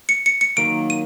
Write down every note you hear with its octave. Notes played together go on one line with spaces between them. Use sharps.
C#7
C#7
C#7
D#3 F#3 A#3 D7
D#7